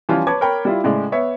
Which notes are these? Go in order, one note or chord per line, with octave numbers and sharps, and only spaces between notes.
E3 F3 G3 C#4 F4
B4 C#5 A5 D6 G#6
A#4 C#5 G5 B5
G3 E4 F4
A2 C#3 G#3 D5
B3 C#5 E5